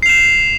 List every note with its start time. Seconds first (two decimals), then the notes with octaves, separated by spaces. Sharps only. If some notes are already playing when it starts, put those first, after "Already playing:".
0.02 C7
0.06 F7
0.09 E7